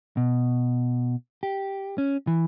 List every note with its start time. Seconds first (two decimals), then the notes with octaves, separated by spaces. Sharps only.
0.17 B2
1.43 G4
1.98 C#4
2.27 E3